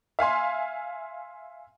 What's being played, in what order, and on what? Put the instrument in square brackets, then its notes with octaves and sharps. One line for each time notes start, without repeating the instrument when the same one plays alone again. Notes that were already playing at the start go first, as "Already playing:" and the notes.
[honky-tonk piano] E5 F5 G#5 C6